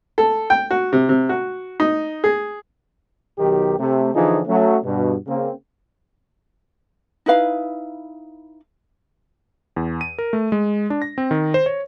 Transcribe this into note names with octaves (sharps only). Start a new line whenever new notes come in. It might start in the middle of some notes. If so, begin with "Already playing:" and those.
A4
G5
F#4
C3
C3
F#4
D#4
G#4
B1 D#3 F#3 G4
C3 A3
D3 E3 F3 D#4 F4 G#4
F#3 A3 C#4
G2 B2
C#3 A#3 C4
D#4 E4 B4 F5
E2
D#7
A#4
A3
G#3
D4
A#6
C4
D#3
C5
C#5